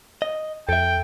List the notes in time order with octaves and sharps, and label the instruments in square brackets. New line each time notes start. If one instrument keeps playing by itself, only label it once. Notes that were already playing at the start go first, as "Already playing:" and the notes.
[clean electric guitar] D#5
[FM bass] F2 [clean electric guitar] A4 E5 [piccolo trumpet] G5